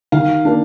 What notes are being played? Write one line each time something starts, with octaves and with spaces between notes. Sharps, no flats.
D#3 F5
A#3 D4